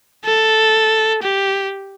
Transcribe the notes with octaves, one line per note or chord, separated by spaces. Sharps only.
A4
G4